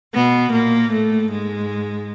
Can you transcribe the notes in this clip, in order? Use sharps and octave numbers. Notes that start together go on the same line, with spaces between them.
B2 B3
A#2 A#3
A2 A3
G#2 G#3